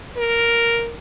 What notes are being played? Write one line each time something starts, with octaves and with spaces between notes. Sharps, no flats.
A#4